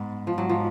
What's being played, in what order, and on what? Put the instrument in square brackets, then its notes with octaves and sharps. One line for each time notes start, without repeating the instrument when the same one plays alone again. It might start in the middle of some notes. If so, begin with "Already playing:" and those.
Already playing: [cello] G#2 [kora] B3
[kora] F3
[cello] G#2 [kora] F#3
[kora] F3